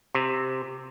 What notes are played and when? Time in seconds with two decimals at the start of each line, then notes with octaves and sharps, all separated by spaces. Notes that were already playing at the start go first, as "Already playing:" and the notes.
0.15 C3